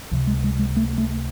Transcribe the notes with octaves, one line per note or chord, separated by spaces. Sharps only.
C#2 C3 F3
G#3
G#3
G#3
A3
A3